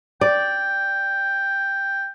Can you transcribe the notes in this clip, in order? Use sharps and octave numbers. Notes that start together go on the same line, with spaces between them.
D5 G5